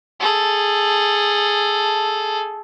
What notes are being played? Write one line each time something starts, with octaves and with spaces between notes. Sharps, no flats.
G#4 A4